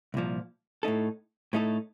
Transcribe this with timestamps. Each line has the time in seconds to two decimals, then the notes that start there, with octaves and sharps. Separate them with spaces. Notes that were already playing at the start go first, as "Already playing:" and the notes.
0.14 C2 A#2 F3
0.83 A2 A3 D#4 A4
1.53 A2 A3 D#4 A4